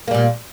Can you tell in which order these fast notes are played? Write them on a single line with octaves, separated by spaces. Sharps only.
A#3 G3 A#2